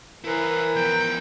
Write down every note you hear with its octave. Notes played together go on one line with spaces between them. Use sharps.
E3 E4 A#4 C5
F3 B3 G5